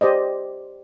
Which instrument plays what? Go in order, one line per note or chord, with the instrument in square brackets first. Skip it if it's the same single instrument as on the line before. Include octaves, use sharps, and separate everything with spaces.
[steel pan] G4 C5 D5 D#5